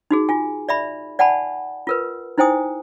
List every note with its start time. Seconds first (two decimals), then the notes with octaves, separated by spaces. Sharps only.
0.11 D#4 F#4 G#4
0.29 F4 G#5
0.69 D5 E5 B5
1.19 D5 F#5 G#5 A5 B5
1.87 F4 A#4 B4
2.38 D#4 E4 C5 G5 G#5 D#6